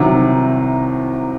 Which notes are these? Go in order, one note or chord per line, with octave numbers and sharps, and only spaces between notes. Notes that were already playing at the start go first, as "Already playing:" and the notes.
Already playing: C2 C3 D#3 F#3